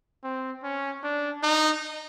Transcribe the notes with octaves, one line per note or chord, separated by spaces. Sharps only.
C4
C#4
D4
D#4